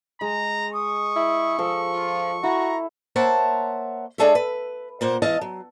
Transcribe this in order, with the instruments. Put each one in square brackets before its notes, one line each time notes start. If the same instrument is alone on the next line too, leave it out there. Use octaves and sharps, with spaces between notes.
[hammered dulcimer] G#3 [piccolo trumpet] A#5
[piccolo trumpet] C#6 [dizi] D#6
[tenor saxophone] E4
[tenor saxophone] F3 [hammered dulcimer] A4
[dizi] F4
[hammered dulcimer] E4 [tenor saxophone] F#4 [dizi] A#5
[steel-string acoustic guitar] A#3 C5 C#5 E5 F#5 A5
G#3 D4 G#4 A4 C#5 E5
B4
A#2 A#3 C5 F#5
E2 E3 G#3 D#5 F5 A5
F#3